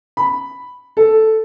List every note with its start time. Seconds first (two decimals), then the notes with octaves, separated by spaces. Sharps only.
0.17 B5
0.97 A4